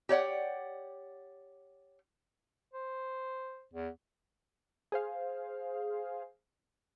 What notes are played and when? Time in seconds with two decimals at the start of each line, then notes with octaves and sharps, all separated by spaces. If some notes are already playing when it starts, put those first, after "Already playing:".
0.09 G4 C#5 D5 F#5
2.74 C5
3.74 E2
4.92 G#4 C5 F5